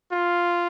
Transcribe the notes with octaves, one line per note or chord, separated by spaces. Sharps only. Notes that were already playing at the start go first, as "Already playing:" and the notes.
F4